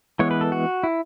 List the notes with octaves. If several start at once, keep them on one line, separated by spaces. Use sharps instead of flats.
E3 G#3 B3 C#5
B4
A4
F#4
E4